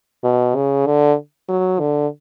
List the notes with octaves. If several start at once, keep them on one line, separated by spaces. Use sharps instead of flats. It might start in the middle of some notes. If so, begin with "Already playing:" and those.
B2
C#3
D3
F#3
D3